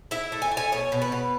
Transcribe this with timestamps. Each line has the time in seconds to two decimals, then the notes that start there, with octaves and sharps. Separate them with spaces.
0.11 E4 E5
0.32 A3
0.42 G#5
0.52 A3
0.57 G#5
0.72 B2 C#5
0.92 B2
1.02 B4
1.12 B2